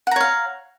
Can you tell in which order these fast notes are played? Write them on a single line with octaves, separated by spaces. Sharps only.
F#5 A#5 C#5 F5